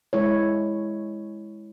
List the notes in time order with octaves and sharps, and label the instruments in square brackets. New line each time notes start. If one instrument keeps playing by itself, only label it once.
[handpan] G#3 E4 C#5